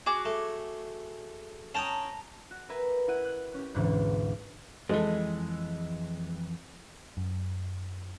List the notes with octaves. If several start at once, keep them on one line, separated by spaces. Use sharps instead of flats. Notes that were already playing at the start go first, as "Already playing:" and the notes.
F#4 G#4 D6
A3
C#4 G5 A5 A#5 D#6
F#4
A#4 B4 E5 G#5
E4 F#5 D#7
F#6
C#4 G4
G#1 D2 G#2 B2 D3 E3
F2 E3 G#3 A4
F#2